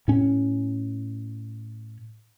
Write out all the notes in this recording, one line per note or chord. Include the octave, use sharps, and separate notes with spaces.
A2 C#4